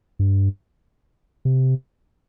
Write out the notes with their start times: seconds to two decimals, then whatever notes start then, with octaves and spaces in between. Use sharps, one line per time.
0.19 G2
1.45 C3